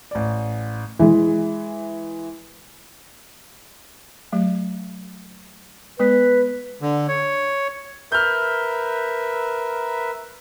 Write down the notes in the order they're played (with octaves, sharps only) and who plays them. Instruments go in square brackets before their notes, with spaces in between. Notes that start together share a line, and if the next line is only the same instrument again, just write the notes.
[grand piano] A1 D5
[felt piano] E3 G#3
[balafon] F#3 A3
[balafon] G#3 B3 [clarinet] B4
[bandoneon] D3
C#5
[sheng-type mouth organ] A#4 B4 E5 [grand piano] F6 G6